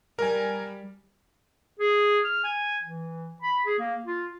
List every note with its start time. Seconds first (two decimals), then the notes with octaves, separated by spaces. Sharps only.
0.19 G3 A#4 G#5
1.79 G#4
2.24 F6
2.44 G#5
2.83 E3
3.42 B5
3.66 G#4
3.79 A#3
4.06 F4